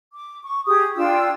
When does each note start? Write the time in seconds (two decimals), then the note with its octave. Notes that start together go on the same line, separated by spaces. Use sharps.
0.13 D6
0.42 C#6
0.66 G4 G#4 D#6
0.96 D4 F4 G5 E6